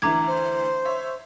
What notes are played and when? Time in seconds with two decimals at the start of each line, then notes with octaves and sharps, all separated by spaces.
0.02 D2 D3 E3 A#5 D6 G#6
0.27 C5
0.85 C#5 E5